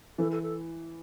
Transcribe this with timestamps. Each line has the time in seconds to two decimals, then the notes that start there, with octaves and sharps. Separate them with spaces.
0.18 E3 A4
0.32 A4
0.43 A4